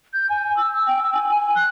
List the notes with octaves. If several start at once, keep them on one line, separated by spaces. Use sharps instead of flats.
G6
G#5
E6
G5
E6
G#5
G#5
F#6